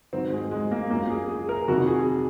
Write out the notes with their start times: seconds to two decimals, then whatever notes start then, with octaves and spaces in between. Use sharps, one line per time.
0.13 G#2 D#3 F#3 C4
0.32 G#3
0.51 G#3
0.71 A#3
0.90 F#2 A#3
0.94 F3
1.10 G#4
1.29 G#4
1.49 A#4
1.68 F2 C3 D#3 F#3 F#4
1.87 G#4